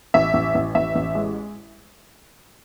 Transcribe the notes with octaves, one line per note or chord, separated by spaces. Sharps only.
A1 E5
A1
A1
A1 E5
A1
G#3